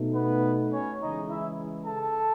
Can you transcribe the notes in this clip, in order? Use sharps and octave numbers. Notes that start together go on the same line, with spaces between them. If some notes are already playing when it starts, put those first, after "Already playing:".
Already playing: B2 A3 D#4
B3 B4
C#4 C#5
C#3 E3 G#3 D#4 D#5
E4 E5
A4 A5